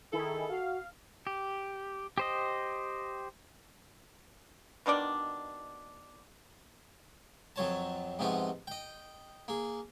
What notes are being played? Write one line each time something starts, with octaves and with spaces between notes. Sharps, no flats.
D#3 E4 G#4 A4
F#4 F5
G4
G4 C5 D#5
B2 D#3 D4 D5
F2 F#3 C#5 A5
G#2 C3 F3 B3 F#4
D#5 G5
A#3 G#4